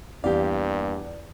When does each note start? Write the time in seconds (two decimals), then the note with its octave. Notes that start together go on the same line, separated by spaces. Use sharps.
0.24 E2 G2 A#3 G4 D5 F5